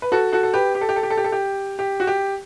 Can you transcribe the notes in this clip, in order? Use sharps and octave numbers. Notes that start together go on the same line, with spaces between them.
B4
F#4 A4
F#4 A4
A4
G4 B4
G4
A4
G4
A4
G4
A4
G4
A4
G4
G4
F#4
G4